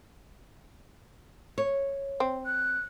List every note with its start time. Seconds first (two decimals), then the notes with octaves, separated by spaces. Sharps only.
1.58 C#5
2.20 C4
2.46 F#6